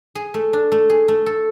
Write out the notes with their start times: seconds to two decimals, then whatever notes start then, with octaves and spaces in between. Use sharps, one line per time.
0.15 G#4
0.34 A3
0.53 D4
0.72 A3
0.90 G#4
1.08 A3
1.26 A4